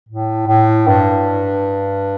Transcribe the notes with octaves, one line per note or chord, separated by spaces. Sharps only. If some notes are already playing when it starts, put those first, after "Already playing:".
A2
A2
G2